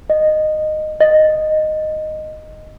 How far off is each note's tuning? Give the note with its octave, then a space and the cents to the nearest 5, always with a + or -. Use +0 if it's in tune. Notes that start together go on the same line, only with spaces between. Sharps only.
D#5 -15
D#5 -5